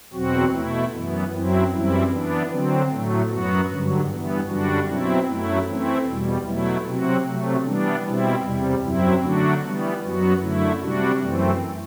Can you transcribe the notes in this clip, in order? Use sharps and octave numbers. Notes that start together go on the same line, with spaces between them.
E2 B2 F#3 C4 F#4
B2 A3 E4
F#2 E3 B3
F#2 F#3 C4 E4
F#2 E3 G3 C4 E4
E3 B3 D4
D3 F#3 C4
A2 F#3 A3
F#2 F#3 B3 F#4
G2 D3 F#3
G2 E3 B3
F#2 D3 G3 D4 F#4
B2 F#3 C4 E4
F#2 F#3 A3 E4
E3 A3 C4 E4
E2 B2 G3
B2 F#3 A3 E4
C3 F#3 C4 F#4
C3 F#3 A3
E3 G3 B3 D4
B2 G3 C4 E4
E2 C3 G3
F#2 F#3 C4 E4
D3 F#3 A3 D4 F#4
E3 G3 B3
F#2 F#3 B3 F#4
F#2 D3 A3 E4
C3 G3 D4 F#4
F#2 E3 A3 C4